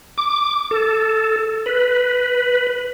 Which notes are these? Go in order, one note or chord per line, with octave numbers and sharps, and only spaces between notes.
D6
A4
B4